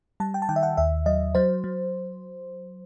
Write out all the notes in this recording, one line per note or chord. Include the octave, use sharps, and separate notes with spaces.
G3 A5
G5
A5
D#3 G5
E5
F#5
D#2 E5
F#3 D#5
F#3 C5
F#3